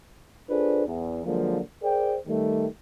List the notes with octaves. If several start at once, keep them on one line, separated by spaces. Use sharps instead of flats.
D4 F4 G#4 A4 B4 C5
E2
D3 F3 F#3 G#3 A#3
G#4 A#4 C5 D5 G5
D#3 G3 A3